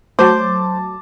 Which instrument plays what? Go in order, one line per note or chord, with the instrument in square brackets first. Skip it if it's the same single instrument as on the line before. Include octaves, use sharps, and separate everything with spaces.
[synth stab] F#3 A3 [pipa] C5 [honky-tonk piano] A5 D6